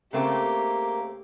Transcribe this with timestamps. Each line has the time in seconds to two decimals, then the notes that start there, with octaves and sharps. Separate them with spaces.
0.13 C#3 A3 A#3 C4 G4